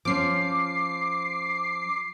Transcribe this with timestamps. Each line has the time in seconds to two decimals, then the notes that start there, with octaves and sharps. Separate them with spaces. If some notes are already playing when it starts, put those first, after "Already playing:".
0.05 F3 C#4 D6 C7